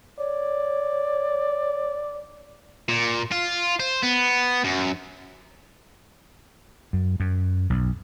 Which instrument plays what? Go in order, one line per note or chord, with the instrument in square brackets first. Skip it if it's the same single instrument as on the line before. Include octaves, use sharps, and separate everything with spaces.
[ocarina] C#5 [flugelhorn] D5
[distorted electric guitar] A#2
F4
C5
B3
F#2
[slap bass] F#2
F#2
B1